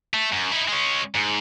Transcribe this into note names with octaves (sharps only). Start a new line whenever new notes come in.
A3
F#2
D#4 E4
G#3 C#4
G#2